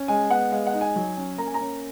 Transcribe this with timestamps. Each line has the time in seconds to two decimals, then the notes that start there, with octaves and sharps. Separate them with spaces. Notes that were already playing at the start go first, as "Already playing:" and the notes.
Already playing: C#4
0.08 G#3 G#5
0.30 B3 F#5
0.51 G#3 F5
0.67 F#5
0.73 D#4
0.81 G#5
0.96 F#3
1.17 C#4
1.38 A#3 A#5
1.47 G#5
1.54 A#5
1.61 C#4